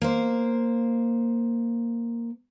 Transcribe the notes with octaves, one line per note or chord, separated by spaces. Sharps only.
A#3 C5